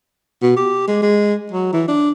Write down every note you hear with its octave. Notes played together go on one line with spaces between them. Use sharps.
B2
G4
G#3
G#3
F#3
E3
D4